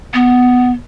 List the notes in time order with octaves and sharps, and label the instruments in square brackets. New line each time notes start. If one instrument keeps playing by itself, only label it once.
[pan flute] B3